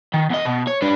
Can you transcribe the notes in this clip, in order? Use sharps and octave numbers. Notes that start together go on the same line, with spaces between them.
D#3
E2 D#5
B2
C#5
D4 B4